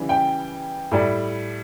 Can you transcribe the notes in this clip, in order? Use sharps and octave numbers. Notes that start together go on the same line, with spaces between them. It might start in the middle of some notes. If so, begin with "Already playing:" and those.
Already playing: C#3 E3 G3
G5
A2 G3